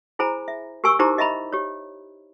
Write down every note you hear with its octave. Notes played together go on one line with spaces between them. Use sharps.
E4 G#4 C5 G#5 A#5 B5
E5
G4 A#4 G#5 C#6 E6
D#4 E4 G4 C5 A#5 D6
G4 D#5 E5 A#5 B5
G4 C#5